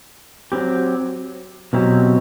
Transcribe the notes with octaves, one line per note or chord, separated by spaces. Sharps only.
F#3 C4 G4
B2 F#3 C4 E4 G4